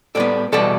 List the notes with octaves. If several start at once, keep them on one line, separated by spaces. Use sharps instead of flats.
A2 G3 B3 A4 D5
E2 B2 G3 B3 A4 D5